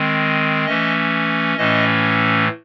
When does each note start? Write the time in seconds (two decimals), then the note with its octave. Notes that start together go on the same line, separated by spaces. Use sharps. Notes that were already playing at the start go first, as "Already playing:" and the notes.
Already playing: D#3 G#3 C4
0.66 E3 A3 C#4 D#5
1.57 A2 E3 A3 C#4 D#5